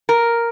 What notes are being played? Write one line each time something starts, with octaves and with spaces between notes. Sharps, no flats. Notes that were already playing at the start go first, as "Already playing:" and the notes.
A#4